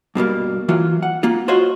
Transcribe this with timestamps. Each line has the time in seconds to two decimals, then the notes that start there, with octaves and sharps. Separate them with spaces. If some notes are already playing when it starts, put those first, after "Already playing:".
0.15 G2 B2 G3 A#3
0.69 E3 F#3 A#3 F4
1.03 F#5
1.23 A#3 F4
1.48 F4 F#4 C5 C#5 D#5 F5